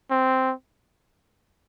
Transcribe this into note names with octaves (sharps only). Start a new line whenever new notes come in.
C4